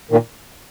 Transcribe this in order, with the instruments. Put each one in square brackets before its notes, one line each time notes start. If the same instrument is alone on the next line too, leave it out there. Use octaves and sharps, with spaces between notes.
[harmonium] A#2 D#3